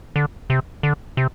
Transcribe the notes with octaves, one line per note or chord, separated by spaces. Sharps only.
D3
C3
D3
C3